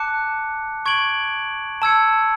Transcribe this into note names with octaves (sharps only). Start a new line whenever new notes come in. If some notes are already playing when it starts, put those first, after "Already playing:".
Already playing: A5 D6 F#6 C#7
C#6 G#6 D7 F#7
A5 E6 G#6 C#7